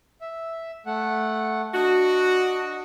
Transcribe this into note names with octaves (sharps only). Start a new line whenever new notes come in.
E5
A3 F#5
D4 F#4 D#5